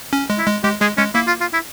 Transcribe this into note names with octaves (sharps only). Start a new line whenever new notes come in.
C#4
G#3
E4
G#3
G#3 G4
G#3 G#4
G#3 C#4
A#3 E4
F4
F4
E4